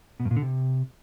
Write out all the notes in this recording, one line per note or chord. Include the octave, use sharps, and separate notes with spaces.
B2
G2
A#2
D3
C3